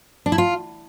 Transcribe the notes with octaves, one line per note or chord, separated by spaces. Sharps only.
D4
E4
F4